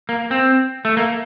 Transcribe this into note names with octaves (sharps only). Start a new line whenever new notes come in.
A#3
C4
A3
A#3